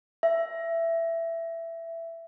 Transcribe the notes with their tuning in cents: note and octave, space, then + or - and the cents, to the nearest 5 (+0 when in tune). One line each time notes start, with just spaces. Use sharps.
E5 +15